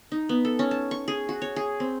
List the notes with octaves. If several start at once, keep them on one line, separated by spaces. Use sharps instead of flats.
D#4
B3
A4
C#4
A5
C#6
G#4
F#4
C#5
G#4
C4